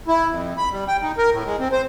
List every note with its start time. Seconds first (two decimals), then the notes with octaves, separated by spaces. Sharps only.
0.08 E4
0.30 F2
0.58 B5
0.71 G3
0.88 G5
1.03 D#4
1.18 A#4
1.32 A2
1.45 G#3
1.59 C4
1.72 C5